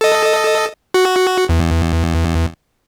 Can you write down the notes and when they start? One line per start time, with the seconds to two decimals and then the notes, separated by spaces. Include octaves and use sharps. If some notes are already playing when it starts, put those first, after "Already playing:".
0.01 A4 D#5
0.94 F#4
1.49 E2